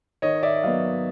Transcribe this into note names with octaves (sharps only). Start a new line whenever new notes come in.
D#3 C#5 D#5
D5 E5
F#3 B3 D#5 F5